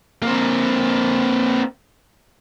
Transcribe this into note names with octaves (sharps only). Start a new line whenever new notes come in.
A#3 C4